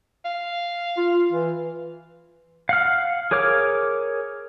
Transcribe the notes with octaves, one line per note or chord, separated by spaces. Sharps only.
F5
F4
E3
F5 F#5 F6
G#4 A#4 C#5 D6 F6